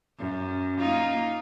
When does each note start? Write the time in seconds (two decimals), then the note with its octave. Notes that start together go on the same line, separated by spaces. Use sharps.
0.19 F#2
0.78 A#3 D#4 F4